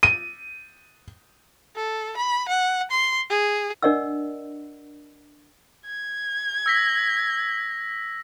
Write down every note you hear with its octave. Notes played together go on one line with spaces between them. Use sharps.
D#7
A4
B5
F#5
C6
G#4
D4 A#4 D5 D#5 F#5 E6
G#6
E6 A#6 B6